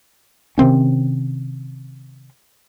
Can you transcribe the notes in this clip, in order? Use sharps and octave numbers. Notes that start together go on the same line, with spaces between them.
C3 D#3 C4 C#4